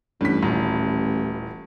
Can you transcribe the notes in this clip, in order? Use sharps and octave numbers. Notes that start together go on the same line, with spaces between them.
A1 G2 B6
D#1